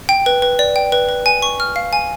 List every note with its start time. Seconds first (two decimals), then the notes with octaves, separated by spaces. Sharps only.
0.09 G5
0.26 B4
0.42 B4
0.59 D5
0.76 G5
0.92 B4
1.09 B4
1.26 G#5
1.42 C#6
1.60 F6
1.76 F5
1.93 G#5